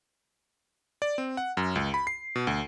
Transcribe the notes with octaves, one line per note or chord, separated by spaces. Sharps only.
D5
C4
F#5
F#2
C#2
B5
C7
B2
D2